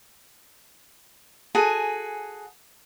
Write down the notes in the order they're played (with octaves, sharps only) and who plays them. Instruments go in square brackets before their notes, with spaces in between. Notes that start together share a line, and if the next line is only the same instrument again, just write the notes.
[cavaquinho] F#4 G#4 A4 G#5